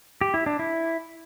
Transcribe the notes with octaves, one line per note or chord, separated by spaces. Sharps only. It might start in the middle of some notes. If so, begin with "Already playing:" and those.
G4
E4
D4
E4